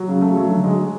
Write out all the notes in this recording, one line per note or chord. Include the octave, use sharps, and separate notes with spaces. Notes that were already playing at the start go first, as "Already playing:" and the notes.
Already playing: F#3
C#3
A3
F#3
D3
G#3
G#3